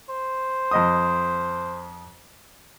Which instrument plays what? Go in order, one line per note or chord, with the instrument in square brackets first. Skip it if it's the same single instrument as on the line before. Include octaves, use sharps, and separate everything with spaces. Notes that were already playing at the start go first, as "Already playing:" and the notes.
[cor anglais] C5
[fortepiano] F2 D#5 D#6